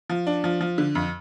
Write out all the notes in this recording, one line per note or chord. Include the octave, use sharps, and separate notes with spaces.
F3
D4
F3
F3
D3
F2